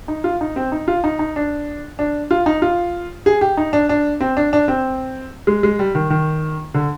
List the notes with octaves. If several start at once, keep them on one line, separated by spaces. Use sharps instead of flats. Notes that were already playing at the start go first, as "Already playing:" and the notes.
D#4
F4
D#4
C4
D#4
F4
D#4
D#4
D4
D4
F4
D#4
F4
G#4
G4
D#4
D4
D4
C4
D4
D4
C4
G#3
G#3
G3
D#3
D#3
D3